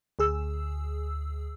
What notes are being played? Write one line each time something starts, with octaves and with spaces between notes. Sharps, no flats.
D2 G#4 E6